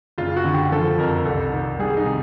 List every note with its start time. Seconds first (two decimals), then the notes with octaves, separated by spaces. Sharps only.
0.18 F#1 F4
0.36 F#4
0.44 D3
0.53 G4
0.72 F3 A4
0.98 F2 A#4
1.25 C2 A4
1.52 D#3
1.79 G3 G#4
1.97 D#4
2.05 C3